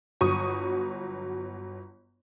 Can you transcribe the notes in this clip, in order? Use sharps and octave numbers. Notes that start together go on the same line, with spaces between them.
G1 F#3 C#6 D#6 D#7